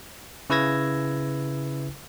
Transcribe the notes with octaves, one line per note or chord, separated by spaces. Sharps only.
C#3 E4 B4 E6 G#6 A#6